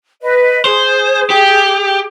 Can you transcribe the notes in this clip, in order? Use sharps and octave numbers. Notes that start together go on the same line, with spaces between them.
B4 D#5
G#4 C5
G4